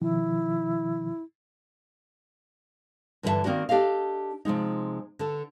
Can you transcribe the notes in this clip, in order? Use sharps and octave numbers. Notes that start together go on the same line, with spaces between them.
B2 D#3 F3 E4
G2 D3 E3 G#4 E5 A5
D#3 A#3 C4 D4 F#4
D4 G4 A4 D#5 F5
C3 F3 G#3 D#4
D3 A4